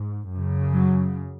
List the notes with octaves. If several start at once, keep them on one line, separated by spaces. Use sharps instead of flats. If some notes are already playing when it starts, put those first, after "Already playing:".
Already playing: G#2
F#2 C#3
F#3